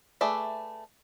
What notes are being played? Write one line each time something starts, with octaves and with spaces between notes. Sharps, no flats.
A3 G#4 B4 D5 E5